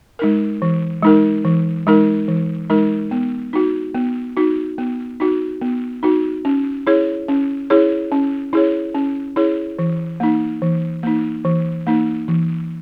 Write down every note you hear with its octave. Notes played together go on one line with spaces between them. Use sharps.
G#3 D#4 A#4
E3
G#3 D#4 A#4
E3
G#3 D#4 A#4
E3
G#3 D#4 A#4
B3
D#4 F#4
B3
D#4 F#4
B3
D#4 F#4
B3
D#4 F#4
C#4
E4 G#4 C#5
C#4
E4 G#4 C#5
C#4
E4 G#4 C#5
C#4
E4 G#4 C#5
E3
A#3 D#4
E3
A#3 D#4
E3
A#3 D#4
E3